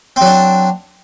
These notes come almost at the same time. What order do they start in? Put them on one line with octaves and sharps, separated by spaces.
C4 F#3 D4